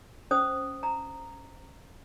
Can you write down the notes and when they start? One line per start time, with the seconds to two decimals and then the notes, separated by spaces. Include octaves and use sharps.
0.31 C#4 C5 D#6
0.83 A#5